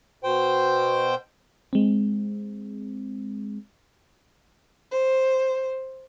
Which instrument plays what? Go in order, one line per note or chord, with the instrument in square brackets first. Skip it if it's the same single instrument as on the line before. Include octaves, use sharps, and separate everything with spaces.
[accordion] B2 C5 G5
[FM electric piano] G#3 C4
[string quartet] C5